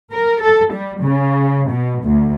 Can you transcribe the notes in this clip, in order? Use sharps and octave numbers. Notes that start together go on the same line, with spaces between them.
A#4
A4
G3
C#3
B2
D2